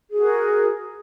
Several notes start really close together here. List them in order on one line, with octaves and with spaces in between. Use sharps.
G#4 F#4 A#4